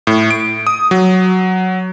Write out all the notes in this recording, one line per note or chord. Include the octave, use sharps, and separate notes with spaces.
A2
D7
D#6
F#3